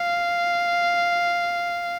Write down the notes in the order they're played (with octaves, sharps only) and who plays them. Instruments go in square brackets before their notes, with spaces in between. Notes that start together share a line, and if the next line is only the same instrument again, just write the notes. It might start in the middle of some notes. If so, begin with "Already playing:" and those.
Already playing: [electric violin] F5